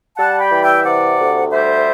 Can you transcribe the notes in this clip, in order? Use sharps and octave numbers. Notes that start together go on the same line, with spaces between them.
G3 F#5 A5
G5 B5
E3
E5 G5
C3 D5 F#5
D2
G3 C5 E5